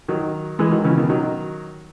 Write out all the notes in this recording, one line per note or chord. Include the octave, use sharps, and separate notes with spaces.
D#3 F#3
E3 G#3
D#3 F#3
C#3 E3
B2 D#3
D#3 F#3